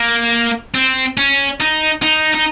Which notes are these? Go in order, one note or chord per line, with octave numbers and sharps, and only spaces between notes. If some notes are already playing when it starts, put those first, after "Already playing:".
Already playing: A#3
C4
C#4
D#4
D#4
D#4